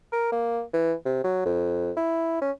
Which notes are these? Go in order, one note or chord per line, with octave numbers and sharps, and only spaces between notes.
A#4
A#3
E3
C3
F#3
F2
E4
C#4